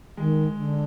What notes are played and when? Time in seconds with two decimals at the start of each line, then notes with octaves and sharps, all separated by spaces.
0.17 D#3 G#3
0.55 D3